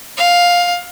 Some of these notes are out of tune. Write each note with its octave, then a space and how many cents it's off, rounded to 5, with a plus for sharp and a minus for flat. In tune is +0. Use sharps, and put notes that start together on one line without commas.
F5 +10